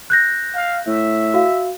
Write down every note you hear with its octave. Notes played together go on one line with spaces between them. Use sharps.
F#6 G6 A#6
F5
A2 E5
F#4 F5